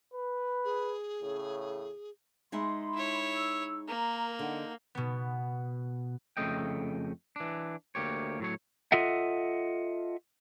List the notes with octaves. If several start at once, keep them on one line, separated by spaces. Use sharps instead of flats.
B4
G#4
A2 C#3
G#3 D#4 E5 B5 C6
E4 C#5
E6
A#3 A#4 A#5
D3 D#4 F#5
B2 B3
F2 C#3 A3 D#5 G5
E3 D4
D2 A#3 G4 C#5
A2 F#3 C#5
F4 A4 D#5 E5 F#5